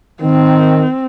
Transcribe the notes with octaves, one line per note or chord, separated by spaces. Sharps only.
D#3 C4